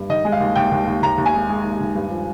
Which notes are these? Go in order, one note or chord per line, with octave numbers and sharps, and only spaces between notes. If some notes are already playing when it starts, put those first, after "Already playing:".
Already playing: G2
D#3 D#5
G#3
F5
D#2
D#2 G5
D#2
D#2
D#2 A#5
D#2
G#5
G#3
G#3
D#2
D#3
G2
F3